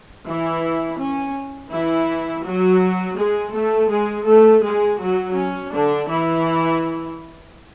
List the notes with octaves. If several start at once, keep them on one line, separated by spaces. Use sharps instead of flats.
E3 E4
C#4
E3 E4
F#3 F#4
G#3 G#4
A3 A4
G#3 G#4
A3 A4
G#3 G#4
F#3 F#4
C#4
D3 D4
E3 E4